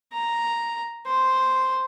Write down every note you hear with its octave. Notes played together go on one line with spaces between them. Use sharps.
A#5
C5